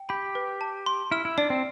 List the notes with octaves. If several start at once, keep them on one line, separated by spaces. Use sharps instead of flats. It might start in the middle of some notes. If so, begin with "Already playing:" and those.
Already playing: G5
G4 B5
B4
A5
C6
E4 F6
E4
D4 D5
C4